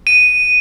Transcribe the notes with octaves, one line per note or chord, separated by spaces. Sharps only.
D#7